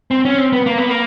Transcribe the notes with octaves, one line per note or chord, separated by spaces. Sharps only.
C4
C#4
C4
B3
A#3
B3
A#3